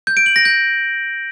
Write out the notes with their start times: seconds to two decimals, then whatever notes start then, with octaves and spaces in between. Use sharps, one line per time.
0.07 G6
0.17 D7
0.26 F#7
0.36 A#6
0.45 G6